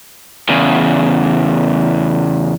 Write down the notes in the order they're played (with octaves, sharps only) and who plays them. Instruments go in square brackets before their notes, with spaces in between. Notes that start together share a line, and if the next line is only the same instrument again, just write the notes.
[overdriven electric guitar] E2 C#3